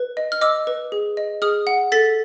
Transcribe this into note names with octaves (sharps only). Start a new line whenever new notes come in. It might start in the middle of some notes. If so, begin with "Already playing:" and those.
Already playing: B4
D#5
F6
D#5 D6 E6
B4
G#4
D#5
G#4 D#6 F6
F#5
A4 A6 B6